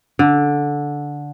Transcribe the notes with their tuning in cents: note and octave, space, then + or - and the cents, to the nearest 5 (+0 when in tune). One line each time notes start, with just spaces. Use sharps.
D3 -10